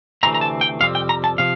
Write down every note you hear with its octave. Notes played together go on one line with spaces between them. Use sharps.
D2 C3 E3 A3 C4 A#5
A#5
A5
G5
F2 C3 G3 C4 F5
G5
A#5
A5
C3 F3 F5